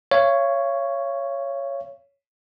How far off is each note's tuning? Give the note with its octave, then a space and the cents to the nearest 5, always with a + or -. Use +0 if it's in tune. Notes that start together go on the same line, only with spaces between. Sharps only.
C#5 +0 F5 -40